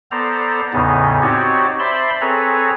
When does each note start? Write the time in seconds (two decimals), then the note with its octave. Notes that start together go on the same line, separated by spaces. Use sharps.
0.11 B3 A4 C5 D5 A#5
0.73 E2 A2 C#3 B3 D#4
1.22 C4 D#4 F#4 G4 C#5 D5
1.80 C5 D5 E5 A5 B5 C6
2.21 C4 G#4 A4 B4 C#5 A#5